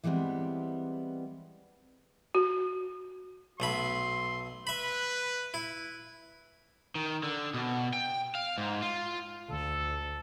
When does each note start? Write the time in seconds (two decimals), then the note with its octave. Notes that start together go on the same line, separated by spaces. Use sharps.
0.04 E3 G3 G#3 B3 C4
2.35 F#4
3.60 B1 A3 B5 C6
4.67 B4 E5 B5
5.54 E4
6.95 D#3
7.23 D3
7.54 B2
7.93 G5
8.35 F5
8.58 G#2
8.82 F4
9.49 D2 A4